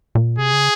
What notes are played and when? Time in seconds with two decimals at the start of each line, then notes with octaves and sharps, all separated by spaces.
0.15 A#2
0.38 C3 G#4
0.53 C#3